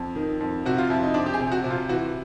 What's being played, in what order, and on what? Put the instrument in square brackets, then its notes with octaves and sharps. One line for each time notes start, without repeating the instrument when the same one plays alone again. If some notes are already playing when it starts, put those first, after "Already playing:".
Already playing: [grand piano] F2
D#3
F2
C3 F#4
F4
F2 E4
D#4
F2 D4
G4
G#4
C3
F#4
C3
F4
E3 F#4